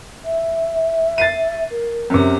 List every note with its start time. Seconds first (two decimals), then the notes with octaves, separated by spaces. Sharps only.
0.24 E5
1.18 A6 C7 D#7
1.71 A#4
2.10 F#2 C3 A#4